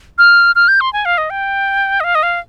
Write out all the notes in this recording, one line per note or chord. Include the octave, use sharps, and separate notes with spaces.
F6
F6
G6
C6
G#5
F5
D#5
G5
D#5
F5
D#5
F5